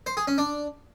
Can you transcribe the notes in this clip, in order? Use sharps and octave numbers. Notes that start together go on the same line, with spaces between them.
C5
G#4
C#4
D4